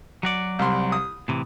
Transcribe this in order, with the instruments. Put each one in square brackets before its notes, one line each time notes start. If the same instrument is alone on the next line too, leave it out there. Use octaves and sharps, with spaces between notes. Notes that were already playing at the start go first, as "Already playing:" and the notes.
[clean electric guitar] F#3 F#4 D5
[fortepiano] C2 C6
D#6
[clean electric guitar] A2 C3 E3